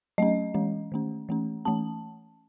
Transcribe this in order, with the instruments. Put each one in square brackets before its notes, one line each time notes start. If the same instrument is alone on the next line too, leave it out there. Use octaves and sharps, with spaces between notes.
[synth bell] F#3 A3 C#4 D#5
E3 G#3 C#4
D#3 A3 C#4
E3 A3 C#4
E3 A3 C#4 A5